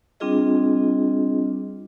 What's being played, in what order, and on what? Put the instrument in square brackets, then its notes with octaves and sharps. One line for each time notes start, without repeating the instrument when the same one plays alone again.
[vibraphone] G3 C4 D4 F4 G#4 D#5